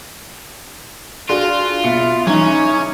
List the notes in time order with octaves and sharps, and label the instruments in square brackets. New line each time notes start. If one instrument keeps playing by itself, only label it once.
[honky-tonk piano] D4 F#4 G#4 [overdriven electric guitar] F4
[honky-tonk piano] B2 C#7 [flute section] E5 F5
[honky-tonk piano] C#3 E3 [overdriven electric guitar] C#4 [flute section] D#4 A#5 G#6